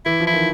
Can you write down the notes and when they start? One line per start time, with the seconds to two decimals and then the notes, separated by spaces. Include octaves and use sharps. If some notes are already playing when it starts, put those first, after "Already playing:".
0.06 E3 E4
0.20 F3
0.27 E4
0.34 D#3